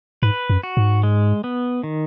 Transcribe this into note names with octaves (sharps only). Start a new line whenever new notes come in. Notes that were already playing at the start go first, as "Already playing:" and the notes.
G#2 B4
F#2
F#4
G#2
G#3
B3
D#3